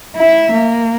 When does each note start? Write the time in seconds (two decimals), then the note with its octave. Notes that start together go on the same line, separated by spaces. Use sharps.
0.16 E4 E5
0.52 A#3